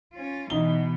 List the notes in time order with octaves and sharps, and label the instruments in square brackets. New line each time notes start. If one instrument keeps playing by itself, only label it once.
[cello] C#4 F4
[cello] B2 E3 [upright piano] D#4 G7